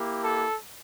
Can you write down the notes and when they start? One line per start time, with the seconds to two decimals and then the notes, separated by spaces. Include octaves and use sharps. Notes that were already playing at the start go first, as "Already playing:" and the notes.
Already playing: A#3 E4 G4
0.24 A4